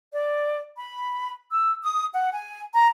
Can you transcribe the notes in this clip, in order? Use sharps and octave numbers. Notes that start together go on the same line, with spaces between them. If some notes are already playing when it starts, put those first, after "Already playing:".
D5
B5
E6
D#6
F#5
G#5
A#5